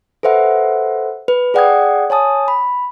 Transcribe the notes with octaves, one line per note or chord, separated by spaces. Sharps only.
A4 B4 C5 E5 F#5
B4
G#4 D5 F#5 G5 D#6 G#6
C#5 G#5 A5 D#6
B5